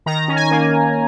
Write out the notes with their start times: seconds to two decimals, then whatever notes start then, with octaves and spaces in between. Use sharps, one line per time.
0.06 D#3 A#5
0.28 C#4
0.36 G#5
0.51 A#3